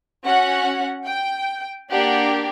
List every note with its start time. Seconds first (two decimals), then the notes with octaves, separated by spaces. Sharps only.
0.24 C#4 F#4 F#5
1.07 G5
1.89 A#3 D4 G4 F#5